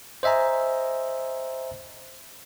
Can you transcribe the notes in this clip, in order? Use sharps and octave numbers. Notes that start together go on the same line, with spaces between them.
C5 D#5 E5 G#5 A#5